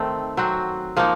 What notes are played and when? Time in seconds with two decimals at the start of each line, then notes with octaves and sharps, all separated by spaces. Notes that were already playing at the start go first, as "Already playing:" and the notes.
Already playing: D#3 A3 C4
0.37 F#3 C4 F#4
0.97 F3 A#3 D#4